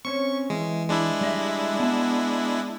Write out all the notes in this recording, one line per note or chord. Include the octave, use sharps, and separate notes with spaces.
C4 C#4 C#5 C#6
E3 G#3
G#3 D4 E4
G3 D#5 E5
B3 A5